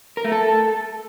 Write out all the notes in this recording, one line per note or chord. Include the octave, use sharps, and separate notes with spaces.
A#4
A3
A4